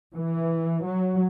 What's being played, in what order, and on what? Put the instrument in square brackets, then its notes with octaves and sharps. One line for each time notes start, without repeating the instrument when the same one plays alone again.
[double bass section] E3
F#3